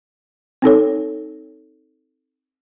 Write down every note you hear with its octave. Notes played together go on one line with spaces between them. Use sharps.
C4 D#4 A4 C#5